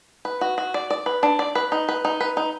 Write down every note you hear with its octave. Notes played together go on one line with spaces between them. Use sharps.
B4
F#4
F#4
D5
D5
B4
D4
D5
B4
D#4
B4
D#4
B4
D#4